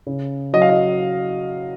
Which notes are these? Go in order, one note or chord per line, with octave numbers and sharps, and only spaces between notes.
C#3
F#3 D#5
F5
D#5